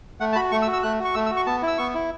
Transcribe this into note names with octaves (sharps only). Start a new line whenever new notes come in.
A3 F#5
A5
F#4 B5
A3 C#6
E6
F#4
E6
A3 F#6
F#4
C#6
A3 E6
E6
F#4
C#6
B3 A5
E4
E6
B3 C#6
E4